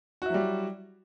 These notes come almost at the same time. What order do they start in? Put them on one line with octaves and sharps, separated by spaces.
F#4 E4 F#3 G3